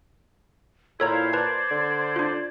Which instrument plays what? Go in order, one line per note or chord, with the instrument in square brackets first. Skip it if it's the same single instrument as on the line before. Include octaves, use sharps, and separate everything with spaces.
[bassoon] A#2 [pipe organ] E4 C5 F5 [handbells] A4 C#5 A#5 [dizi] G#6
[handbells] B4 A5 [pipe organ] C5 D5
[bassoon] D3
[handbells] D4 F4